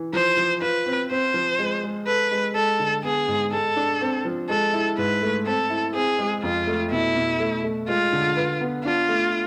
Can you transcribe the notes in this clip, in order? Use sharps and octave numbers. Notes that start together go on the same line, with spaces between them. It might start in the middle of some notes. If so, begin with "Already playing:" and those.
Already playing: E3
F3 C5
F3
F4 B4
C4
C4 C5
F3
G#3
G#3
A4 B4
G#3
G#3 A4
D3
B3 G#4
G#2
G#3 A4
D4
C4
F3
G#3 A4
E4
G#2 B4
A3
C4 A4
E4
C4 G#4
G#3
F2 F4
A3
B2 E4
B2
A3
A3
G#3 F4
D3
B4
B3
D4 F4
A3